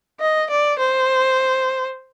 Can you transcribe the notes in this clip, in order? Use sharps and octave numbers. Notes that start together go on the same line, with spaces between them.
D#5
D5
C5